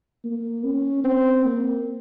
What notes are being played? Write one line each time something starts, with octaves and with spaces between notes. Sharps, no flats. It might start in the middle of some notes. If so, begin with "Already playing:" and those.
A#3
C#4
C4
A#3